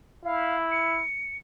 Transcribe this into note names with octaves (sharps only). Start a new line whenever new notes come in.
E4 F5
C#7